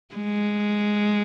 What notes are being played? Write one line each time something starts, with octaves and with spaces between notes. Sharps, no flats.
G#3